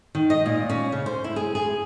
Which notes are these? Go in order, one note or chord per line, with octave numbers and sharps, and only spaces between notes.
D#3
D#5
A#2
C#4
C#3
C5
E4
G#4
G#4